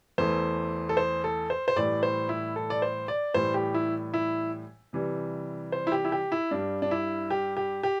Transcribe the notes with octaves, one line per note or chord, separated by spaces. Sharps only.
E2 E3 A3 C5
A4
C5
A4
C5
C5
A2 E3 G3 D5
C5
E4
A4
D5
C5
D5
A2 E3 G3 C5
G4
E4
E4
C3 E3 G3
C5
E4
G4
E4
G4
E4
G2 G3 D4
D4
E4
G4
G4
G4